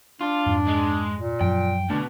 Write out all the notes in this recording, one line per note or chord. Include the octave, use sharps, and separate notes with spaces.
D4 F4
F2 G#2
G#3
A#2
F#2 F3 F#3 G5
B2 D3 A3 D4